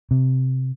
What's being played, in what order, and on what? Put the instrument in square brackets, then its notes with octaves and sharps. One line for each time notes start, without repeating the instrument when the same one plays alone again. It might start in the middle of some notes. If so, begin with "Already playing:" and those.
[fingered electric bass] C3